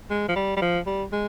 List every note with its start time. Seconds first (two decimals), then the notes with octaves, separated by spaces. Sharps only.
0.10 G#3
0.29 F3
0.36 G3
0.57 G3
0.62 F3
0.86 G3
1.12 G#3